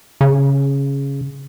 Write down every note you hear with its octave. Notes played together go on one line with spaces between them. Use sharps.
C#3